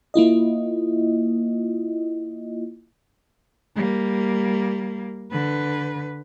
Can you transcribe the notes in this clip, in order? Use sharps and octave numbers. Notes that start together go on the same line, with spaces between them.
A#3 E4 F4 D#5
G3 A#3
D3 B4